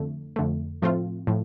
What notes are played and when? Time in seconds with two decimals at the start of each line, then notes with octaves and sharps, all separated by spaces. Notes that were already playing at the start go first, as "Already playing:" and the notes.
Already playing: F2 D3 A3
0.36 F2 D3 A3
0.82 A2 F3 A3 C4 F4
1.27 A2 F3